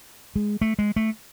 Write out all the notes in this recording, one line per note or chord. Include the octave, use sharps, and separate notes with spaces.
G#3
A3
G#3
A3